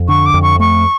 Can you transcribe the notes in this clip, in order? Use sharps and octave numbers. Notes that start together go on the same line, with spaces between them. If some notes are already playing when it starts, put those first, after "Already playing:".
Already playing: F2
D3 C#6
D6
F2
C#6
A3 C#6